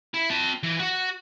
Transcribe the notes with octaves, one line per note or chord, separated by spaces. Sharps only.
E4
C4 A5
E3
F#4